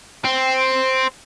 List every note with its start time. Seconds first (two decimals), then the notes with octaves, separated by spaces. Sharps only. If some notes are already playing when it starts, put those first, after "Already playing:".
0.24 C4